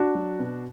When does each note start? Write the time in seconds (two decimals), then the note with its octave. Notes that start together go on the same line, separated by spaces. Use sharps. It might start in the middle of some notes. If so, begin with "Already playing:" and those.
Already playing: D4 F#4
0.15 F#3
0.39 B2